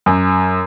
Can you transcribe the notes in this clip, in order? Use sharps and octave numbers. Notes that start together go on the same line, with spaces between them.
F#2